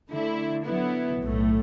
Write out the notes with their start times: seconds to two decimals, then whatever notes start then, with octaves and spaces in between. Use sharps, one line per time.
0.09 D3 A3 E4
0.65 D3 F#3 B3 E4
1.21 B1 A2 A3